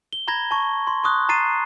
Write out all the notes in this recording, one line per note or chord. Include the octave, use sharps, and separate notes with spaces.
G7
A#5 B5 G#6 A#6
A5 C#6
C6
C6 C#6 D#6 F#6
A#5 A6 C7 D#7